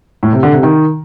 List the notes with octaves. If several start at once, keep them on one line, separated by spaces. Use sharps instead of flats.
A2
C3
D3
C3
D#3